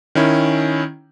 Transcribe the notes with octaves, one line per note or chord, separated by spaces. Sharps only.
D#3 C#4 E4